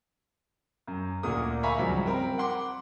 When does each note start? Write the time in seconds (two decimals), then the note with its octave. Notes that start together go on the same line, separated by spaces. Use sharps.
0.87 F#2
1.23 D2 A#2 A#3 A4 D#6
1.63 E5 F5 G#5 A#5 B5 C#6
1.78 C#2 G2 F3 F#3
2.06 C4 A#4 B5
2.38 F#5 C6 D6